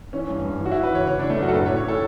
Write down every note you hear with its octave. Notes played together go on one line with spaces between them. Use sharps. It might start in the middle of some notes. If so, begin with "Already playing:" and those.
E3 C#4
G2
G2
E3 F#4
E4
E3
B4
E3 C#5
C#3 C#5
E3 D4
A3
F#2 F#4
A4
A2 B4
C#5
A2
C#5
A2 A4